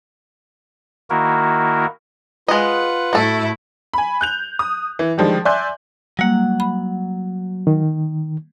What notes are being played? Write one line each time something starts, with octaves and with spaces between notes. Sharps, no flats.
D#3 A#3 E4 F#4 A#4
G#3 F4 B4 D#5 F#5
A2 A3 E4 F#4 A4
G#5 B5
F#6 G6 F7
D#6
E3
D3 D#3 F3 G3 G#3
D5 E5 G#5 C6 F#6 G6
F#3 G3 A#3 F#5
B5
D#3